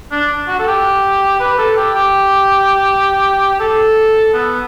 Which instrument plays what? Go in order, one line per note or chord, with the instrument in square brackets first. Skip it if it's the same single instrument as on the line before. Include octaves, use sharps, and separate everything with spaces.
[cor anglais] D4
F#4
A4
G4
B4
A4
G4
G4
A4
B3